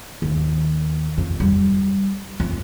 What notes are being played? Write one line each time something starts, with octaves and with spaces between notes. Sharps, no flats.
D#2
F2
G3
F2